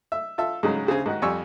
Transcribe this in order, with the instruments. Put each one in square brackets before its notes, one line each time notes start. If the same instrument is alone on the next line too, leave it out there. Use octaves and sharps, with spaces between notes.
[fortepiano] E5
F4 A4 E5
G#2 C#3 F#3 G#3
D2 C#3 C4 G#4
G#2 D#3 F#4
F2 G3 G#5 C#6 E6